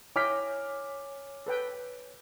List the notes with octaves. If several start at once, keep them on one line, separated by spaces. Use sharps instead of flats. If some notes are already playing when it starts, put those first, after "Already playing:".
E4 C#5 D#5 G5 G#5 D6 F6 B6
A4 B4 G5